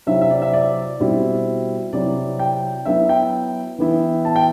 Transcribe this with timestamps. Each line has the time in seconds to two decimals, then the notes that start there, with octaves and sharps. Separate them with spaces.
0.07 C3 F#3 C4 E4 E5
0.21 E5
0.30 D5
0.42 E5
0.53 D5
1.00 B2 G3 C4 E4
1.93 C3 F#3 C4 E4 D5
2.39 G5
2.85 F#3 B3 E4 E5
3.09 G5
3.78 E3 B3 E4
4.25 A5
4.36 G5